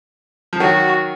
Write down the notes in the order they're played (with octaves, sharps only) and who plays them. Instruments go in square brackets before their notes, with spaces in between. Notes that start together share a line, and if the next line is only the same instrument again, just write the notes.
[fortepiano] F3
[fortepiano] D#3 F#3 [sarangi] F#4